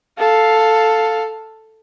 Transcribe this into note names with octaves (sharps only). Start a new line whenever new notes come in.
A4 F5